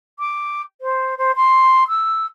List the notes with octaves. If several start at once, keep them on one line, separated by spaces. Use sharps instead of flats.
D6
C5
C5
C6
E6